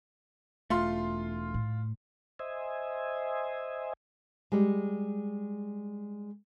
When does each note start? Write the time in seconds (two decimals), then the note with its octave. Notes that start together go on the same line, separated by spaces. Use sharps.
0.70 E1 A3 F4 C6
1.54 A2
2.39 C5 D#5 E5 G#5
4.52 G3 G#3